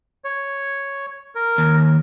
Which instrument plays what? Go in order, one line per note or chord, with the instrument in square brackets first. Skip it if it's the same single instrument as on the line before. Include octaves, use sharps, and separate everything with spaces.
[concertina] C#5
A#4
[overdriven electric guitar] D#2